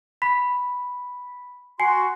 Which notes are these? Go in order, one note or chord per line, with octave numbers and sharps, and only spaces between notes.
B5 B6
F#4 G#5 C6 C7